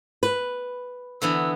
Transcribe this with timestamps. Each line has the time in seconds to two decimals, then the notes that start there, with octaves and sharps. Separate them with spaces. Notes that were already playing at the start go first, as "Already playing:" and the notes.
0.23 B4
1.22 D3 E3 B3 E6